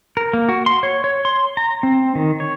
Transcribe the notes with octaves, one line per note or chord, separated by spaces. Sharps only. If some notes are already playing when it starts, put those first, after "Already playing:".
A#4
A#3
F#4
C6
C#5
C#5
C6
A#5
C4
D#3
C#5